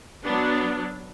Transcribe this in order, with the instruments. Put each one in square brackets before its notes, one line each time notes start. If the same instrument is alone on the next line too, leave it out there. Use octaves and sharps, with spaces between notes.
[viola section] F#3 B3 D4